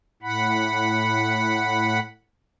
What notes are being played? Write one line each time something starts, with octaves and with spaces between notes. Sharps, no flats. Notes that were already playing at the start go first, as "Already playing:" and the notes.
A2 F#5 B5